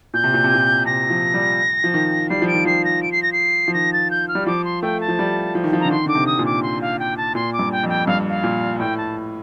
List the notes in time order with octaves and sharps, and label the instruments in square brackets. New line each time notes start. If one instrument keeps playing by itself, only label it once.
[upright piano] A#2 [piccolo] G6
[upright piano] C3
A#2
C3
A#2
[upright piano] C3 [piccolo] A#6
[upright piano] F3
G3
F3
D#3
[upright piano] G3 [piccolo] C7
[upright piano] F3
[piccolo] D7
[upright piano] D#3
[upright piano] F3 [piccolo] C7
[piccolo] A#6
D7
C7
A#6
C7
[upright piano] F3
[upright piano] D#3 [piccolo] A#6
[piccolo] A6
G6
F6
[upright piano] G3
[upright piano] F3 [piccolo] D6
[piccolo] C6
[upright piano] A3 [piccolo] G5
[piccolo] A5
[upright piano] F3
G3
F3
D#3
F3
[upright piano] D3 [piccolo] A#5
[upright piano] D#3 [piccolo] C6
[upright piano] D3 [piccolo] D6
[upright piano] C3
[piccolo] D#6
[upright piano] A#2
[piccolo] D6
C6
F5
G5
A5
[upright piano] A#2 [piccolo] C6
[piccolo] D6
[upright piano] G2
[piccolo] G5
[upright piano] F2
[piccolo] G5
[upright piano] G2 [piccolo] F5
[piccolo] F5
[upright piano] A#2
[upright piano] A2 [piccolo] G5
[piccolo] A5